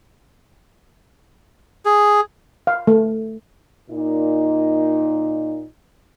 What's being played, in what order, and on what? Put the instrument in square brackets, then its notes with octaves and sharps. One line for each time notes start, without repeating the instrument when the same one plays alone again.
[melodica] G#4
[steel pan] F5
A3
[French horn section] A#2 D#4